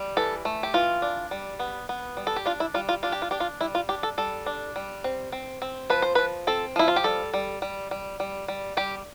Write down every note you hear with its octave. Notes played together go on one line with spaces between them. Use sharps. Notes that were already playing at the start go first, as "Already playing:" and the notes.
Already playing: G3
E3 A4
A3
G4
E3 F4
D4
G3
B3
B3
G3
A4
G4
D4 F4
E4
G3 F4
F4
D4 F4
G4
F4
D4 G4
F4
G3 E4
F4
D4 G4
A4
G3 A4
D4
G3
C4
C4
C4
F3 B4
C5
F3 B4
C4 A4
F3 E4
F4
G4
G3 A4
G3
G3
G3
G3
G3
G3 G4